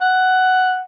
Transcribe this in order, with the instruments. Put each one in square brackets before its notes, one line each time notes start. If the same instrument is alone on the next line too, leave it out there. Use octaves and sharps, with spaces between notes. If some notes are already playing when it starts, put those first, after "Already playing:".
[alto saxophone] F#5